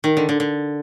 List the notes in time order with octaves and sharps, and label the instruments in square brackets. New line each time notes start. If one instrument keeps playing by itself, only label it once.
[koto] D#3
D3
D3
D3